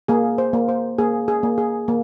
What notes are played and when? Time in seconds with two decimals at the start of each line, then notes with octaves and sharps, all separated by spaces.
0.08 A#3 G#4
0.38 C5
0.53 A#3
0.69 C5
0.98 A#3 G#4
1.28 G#4
1.43 A#3
1.58 G#4
1.88 A#3